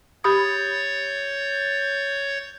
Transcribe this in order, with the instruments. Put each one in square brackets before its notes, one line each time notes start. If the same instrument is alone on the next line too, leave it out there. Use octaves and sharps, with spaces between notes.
[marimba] G4 B5 D#6 [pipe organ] C#5 G6 A6